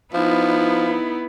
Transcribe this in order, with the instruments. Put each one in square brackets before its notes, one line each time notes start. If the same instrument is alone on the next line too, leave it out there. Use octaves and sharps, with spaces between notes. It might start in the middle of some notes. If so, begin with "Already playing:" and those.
[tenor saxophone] F3 [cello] B3 E4 [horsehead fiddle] D#4